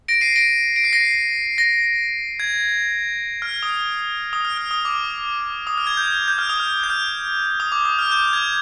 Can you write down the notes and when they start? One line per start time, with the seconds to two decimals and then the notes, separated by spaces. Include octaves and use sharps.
0.08 A#6 D7
0.21 C7 D#7
0.36 A#6 D7
0.76 D7
0.84 C7
0.93 A#6
1.01 C7
1.58 A#6
2.40 G#6
3.42 F6
3.63 D#6
4.33 D#6
4.45 F6
4.58 F6
4.71 D#6
4.85 D6
5.67 D#6
5.78 F6
5.87 G#6
5.97 G6
6.08 G6
6.28 G6
6.38 F6
6.49 D#6
6.60 F6
6.84 G6
6.90 F6
7.60 D#6
7.72 D6
7.85 D#6
7.99 F6
8.12 G6
8.33 G#6